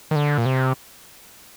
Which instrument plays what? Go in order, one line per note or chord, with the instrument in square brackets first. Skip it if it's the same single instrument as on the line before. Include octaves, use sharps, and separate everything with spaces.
[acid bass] D#3
D3
A#2
C3